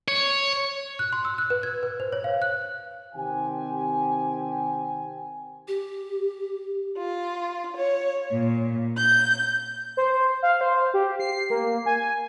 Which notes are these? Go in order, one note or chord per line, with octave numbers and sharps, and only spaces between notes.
C#5
F#6
C6
E6
F#6
B4
G#6
B4
C5
C#5
F5
F#6
C3 D#3 C4 G4 G#5
G4
F4
C#5
A#2
G6
C5
F5
C5
G4
C7
A#3
G#5